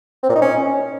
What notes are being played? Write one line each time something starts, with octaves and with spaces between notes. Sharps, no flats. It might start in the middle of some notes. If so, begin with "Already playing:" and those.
C4
A#2
D#4
C#4